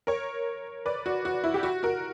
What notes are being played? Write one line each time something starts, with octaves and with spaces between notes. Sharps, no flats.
A#4 C#5
B4 D5
F#4
F#4
E4
G4
F#4
F#4 A#4